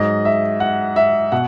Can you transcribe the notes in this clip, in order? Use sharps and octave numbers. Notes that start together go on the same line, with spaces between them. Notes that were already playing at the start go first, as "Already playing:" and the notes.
Already playing: G#2 F#3 D#5
E5
F#5
E5
B2 F#5